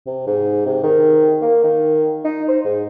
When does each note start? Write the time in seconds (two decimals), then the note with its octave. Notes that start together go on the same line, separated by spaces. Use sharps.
0.06 C3
0.27 G#2
0.66 C3
0.83 D#3
1.42 A#3
1.64 D#3
2.24 D#4
2.49 C5
2.65 G#2